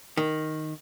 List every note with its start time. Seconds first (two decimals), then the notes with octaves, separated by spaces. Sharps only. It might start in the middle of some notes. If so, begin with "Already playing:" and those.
0.17 D#3